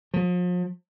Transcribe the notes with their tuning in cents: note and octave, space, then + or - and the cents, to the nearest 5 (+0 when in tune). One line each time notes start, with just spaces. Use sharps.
F3 +40